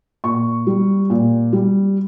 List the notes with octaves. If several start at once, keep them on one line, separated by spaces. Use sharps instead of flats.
A#2 C#6
G3
A#2
G3